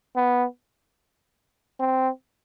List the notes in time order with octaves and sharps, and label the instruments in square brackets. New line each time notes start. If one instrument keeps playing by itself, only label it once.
[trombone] B3
C4